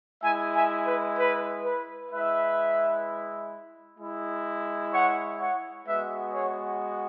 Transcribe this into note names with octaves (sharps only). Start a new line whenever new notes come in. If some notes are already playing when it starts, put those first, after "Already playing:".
G#3 E4 E5 G#5
E5 G#5
B4
B4
B4
G#3 E4 B4 E5
G#3 E4
C#5 F#5
C#5 F#5
G#3 B3 F#4 B4 E5
G#4 C#5